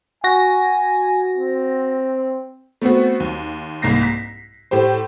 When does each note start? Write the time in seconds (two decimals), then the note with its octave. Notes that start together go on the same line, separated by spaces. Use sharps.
0.24 F#4 G#5 A#6
1.37 C4
2.82 A3 B3 C4 F#4
3.20 D#2
3.82 C2 G#2 A#3 A#6 C7
4.03 B6
4.71 A2 G4 C5